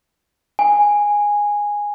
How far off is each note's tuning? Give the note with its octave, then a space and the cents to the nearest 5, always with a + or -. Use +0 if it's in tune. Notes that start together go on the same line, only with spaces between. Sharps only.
G#5 -10